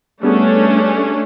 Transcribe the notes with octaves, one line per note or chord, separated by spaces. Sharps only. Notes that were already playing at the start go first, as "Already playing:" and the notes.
G3 A3 B3 C#4 D4 G#4